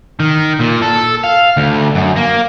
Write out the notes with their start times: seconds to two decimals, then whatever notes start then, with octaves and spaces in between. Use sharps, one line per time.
0.20 D#3
0.59 A#2
0.82 A4
1.24 F5
1.57 D2
1.95 F#2
2.16 A#3